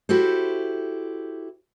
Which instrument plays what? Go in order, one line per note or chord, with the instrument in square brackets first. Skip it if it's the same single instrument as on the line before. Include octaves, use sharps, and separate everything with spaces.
[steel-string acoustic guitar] E4 F#4 G4 A4 C5